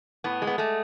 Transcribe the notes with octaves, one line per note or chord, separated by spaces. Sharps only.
A2 B3
G#3
B3
G#3 A3